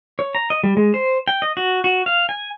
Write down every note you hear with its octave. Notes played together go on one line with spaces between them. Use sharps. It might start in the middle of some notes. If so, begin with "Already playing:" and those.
C#5
A#5
D#5
G3
G#3
C5
G5
D#5
F#4
F#4
F5
G#5